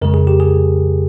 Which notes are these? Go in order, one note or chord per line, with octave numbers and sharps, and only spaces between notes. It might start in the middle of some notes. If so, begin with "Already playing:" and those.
F2 C#3 G#3 A#4
G#4
G4
G#4